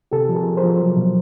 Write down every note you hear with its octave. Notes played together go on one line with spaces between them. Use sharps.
C3 G4 A4
F3
G#4 A#4
F3
A#4 C5
F3
F#3
B2